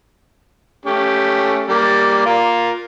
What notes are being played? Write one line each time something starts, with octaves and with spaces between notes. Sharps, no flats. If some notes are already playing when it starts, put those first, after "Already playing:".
A3 C#4 G4
G3 A#3
F4 A#4 F5